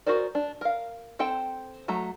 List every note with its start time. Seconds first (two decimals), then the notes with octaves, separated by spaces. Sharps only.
0.06 F#4 G#4 A#4 C5 D5
0.35 D4
0.61 A#4 F5
1.19 C4 A4 C5 G5
1.88 F#3 A3 A#5